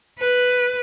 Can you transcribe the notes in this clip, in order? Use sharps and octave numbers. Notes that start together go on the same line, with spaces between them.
B4